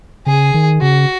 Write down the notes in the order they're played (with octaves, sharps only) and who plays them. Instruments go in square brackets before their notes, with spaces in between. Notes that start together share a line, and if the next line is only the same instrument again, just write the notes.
[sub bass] C#3 [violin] G#4
[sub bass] D#3
[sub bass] C#3 [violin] F#4